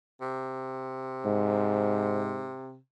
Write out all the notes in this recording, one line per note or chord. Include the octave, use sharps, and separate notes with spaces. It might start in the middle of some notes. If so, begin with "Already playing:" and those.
C3
G#2